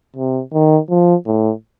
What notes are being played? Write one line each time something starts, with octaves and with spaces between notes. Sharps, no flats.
C3
D#3
F3
A2